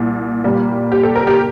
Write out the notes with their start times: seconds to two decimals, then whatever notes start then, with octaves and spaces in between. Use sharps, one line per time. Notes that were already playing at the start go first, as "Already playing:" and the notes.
Already playing: C2 A#2
0.44 A#2 G3 A#3
0.92 G4
1.03 A4
1.15 A#4
1.27 G4